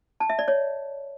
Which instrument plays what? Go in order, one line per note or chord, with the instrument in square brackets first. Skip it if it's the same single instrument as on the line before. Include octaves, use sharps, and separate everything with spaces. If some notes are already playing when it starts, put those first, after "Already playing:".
[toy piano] A5
E5
D5
C#5